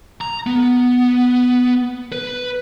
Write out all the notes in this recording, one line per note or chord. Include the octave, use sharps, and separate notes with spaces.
A#5
B3
B4